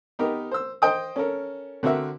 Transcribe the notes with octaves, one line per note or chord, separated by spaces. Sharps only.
B3 D#4 G4 A#4
C5 E6
C5 D#5 G5 D#6
C#4 A4 A#4
D3 C4 F#4 A#4 E5